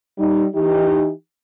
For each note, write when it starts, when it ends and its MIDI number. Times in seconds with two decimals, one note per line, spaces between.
0.17 0.45 55
0.17 0.45 63
0.54 1.11 52
0.54 1.11 63
0.54 1.11 67